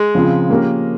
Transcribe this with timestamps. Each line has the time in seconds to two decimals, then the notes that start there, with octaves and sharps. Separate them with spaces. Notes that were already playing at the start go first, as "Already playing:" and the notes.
Already playing: G#3
0.15 C#3 F3 C4 F4
0.50 F3 A#3 C#4 G4 A#4